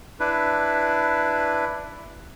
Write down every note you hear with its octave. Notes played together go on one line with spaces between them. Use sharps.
D4 E4 B4